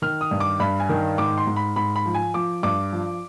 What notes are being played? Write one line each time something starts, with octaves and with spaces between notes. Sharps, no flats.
D#3 F6
D#6
G2
D6
G2 B5
G#5
D#3
G#2 D6
C6
G#2
B5
G#2 B5
B5
F3
G#5
F3 D6
G2 D6
F3